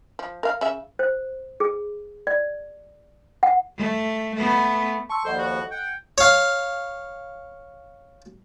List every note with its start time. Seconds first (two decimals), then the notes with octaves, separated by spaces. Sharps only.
0.19 F3
0.43 A#4 F5
0.61 C#3 E5
0.99 C5
1.60 G#4
2.27 D5
3.43 F#5
3.77 A3
4.35 A3 B3
5.10 A5 C6 C#6 E6
5.25 D#2 F3 G3 A4 C5 D#5 F#5
5.38 F#4
5.71 F#5 G5
6.18 C#5 F5